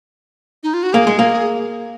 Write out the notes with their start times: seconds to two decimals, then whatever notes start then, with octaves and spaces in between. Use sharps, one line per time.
0.63 D#4
0.74 F4
0.83 F#4
0.93 A#3 G#4
1.07 G#3
1.19 A#3